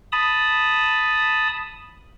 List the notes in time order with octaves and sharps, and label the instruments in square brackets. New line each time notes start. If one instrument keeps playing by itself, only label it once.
[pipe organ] A5 B5 D#6